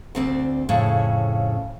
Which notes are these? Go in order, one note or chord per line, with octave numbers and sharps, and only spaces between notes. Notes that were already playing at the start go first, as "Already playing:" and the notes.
D2 C4 D4
F2 A2 C#3